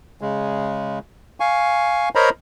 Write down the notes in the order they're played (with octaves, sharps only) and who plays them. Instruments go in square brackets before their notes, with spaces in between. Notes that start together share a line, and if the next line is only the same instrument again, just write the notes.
[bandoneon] C#3 G#3
F5 G#5 C#6
A#4 C5 C#5 D#5 A#5 B5